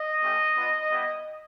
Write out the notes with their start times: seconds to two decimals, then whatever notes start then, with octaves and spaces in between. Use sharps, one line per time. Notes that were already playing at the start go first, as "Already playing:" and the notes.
Already playing: D#5
0.22 A3 C#4 E4 G4
0.56 B3 D4 F4
0.89 G3 B3 E4 G4